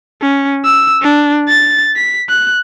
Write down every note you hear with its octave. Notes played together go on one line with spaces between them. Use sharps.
C#4
E6
D4
A6
B6
F#6